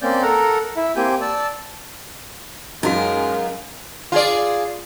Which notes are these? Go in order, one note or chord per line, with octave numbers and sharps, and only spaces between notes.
A#3 C4 C#4 D5 G6
A4 A#4 F#5 A#5
E4 E5
A#3 C4 G4 G#5 G6
D5 A5 E6
F#2 G#3 C#4 D#4 F4 F#4 A#4
F4 G#4 D5